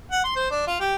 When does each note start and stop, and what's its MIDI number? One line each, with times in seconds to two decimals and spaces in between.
0.11 0.22 78
0.24 0.31 84
0.36 0.47 72
0.51 0.64 62
0.67 0.77 65
0.80 0.95 67